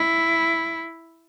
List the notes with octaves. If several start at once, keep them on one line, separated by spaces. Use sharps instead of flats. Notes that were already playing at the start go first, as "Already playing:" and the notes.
Already playing: E4